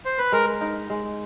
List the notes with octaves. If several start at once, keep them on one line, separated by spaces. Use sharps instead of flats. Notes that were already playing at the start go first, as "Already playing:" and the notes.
C5
B4
G#3 A#4
D#4
G#3